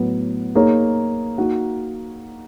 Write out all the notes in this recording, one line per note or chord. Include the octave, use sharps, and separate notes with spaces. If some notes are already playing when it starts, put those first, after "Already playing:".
Already playing: A2 F#3 B3
A#3 D#4 G#4 C#5
A#3 D#4 F#4